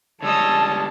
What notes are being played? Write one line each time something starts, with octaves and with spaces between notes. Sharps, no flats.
D3 G3 G#3 C#5 D#5 A5 E6